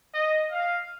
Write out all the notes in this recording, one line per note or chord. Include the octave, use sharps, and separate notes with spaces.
D#5
F5